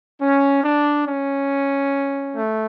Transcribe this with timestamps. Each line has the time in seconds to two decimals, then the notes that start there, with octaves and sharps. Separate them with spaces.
0.22 C#4
0.64 D4
1.06 C#4
2.35 A3